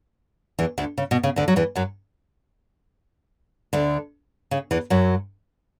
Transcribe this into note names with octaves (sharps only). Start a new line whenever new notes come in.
E2 E3
D2 D3
C#3
B2
C#3
D2 D3
F#3
E2 E3
F#2 F#3
D2 D3
C#3
E2 E3
F#2 F#3